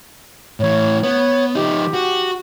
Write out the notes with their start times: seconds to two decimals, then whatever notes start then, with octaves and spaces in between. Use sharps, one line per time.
0.60 A2 E3 C#5
1.03 B3 C#5
1.55 F3 D#4 G4
1.94 F#4